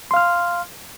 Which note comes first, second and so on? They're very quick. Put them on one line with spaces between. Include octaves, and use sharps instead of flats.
C6 F5 F6